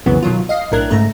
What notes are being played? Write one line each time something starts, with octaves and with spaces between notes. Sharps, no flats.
C2 F2 C#3 E3 F#3 B3
B2 D#3 F#3 F4
D#5 F5 C7
B1 A2 D4 A#4 F#6 G#6
G#2 C#3 A3 A#5